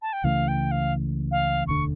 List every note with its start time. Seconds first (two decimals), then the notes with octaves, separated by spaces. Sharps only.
0.02 A5
0.13 G5
0.24 C#2 C#3 E3 A3 F5
0.48 G5
0.71 F5
1.32 F5
1.67 E1 D2 D3 C#6